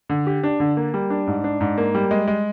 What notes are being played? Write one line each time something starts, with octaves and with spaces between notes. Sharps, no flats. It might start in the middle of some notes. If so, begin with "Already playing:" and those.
D3
G4
D4
D3
A#3
G3
D4
G#2
D4
G#2
A#3
G3
G#3
G#3